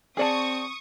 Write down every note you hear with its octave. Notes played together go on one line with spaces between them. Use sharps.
C4 G#4 D5 A5 C#6 D#6